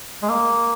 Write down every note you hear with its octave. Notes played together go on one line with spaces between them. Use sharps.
G#3
A#3